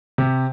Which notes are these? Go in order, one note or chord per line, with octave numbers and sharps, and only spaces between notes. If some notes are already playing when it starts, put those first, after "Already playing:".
C3